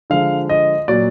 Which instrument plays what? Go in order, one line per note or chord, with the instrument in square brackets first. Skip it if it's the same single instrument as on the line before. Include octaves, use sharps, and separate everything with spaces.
[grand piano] D3 F3 G#3 F5
D#5
A#2 F#3 A#3 D5